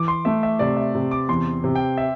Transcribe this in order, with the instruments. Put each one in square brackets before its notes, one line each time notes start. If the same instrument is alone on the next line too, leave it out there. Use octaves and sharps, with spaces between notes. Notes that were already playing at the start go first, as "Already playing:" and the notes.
Already playing: [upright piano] E3 [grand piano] D6
[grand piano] C6
[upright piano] A3 [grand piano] E5
[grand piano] E5
[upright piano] C3 [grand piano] D5
[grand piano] E5
[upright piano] C3
[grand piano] D6
[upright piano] E2 [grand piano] C6
[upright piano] C3
[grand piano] G5
E5